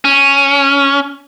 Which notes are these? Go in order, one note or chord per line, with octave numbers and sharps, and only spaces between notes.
C#4